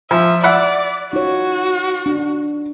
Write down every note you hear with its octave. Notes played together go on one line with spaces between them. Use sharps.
F3 E5
D5 E5 F#5 B5
D#4 F4 F#4 C#5
D4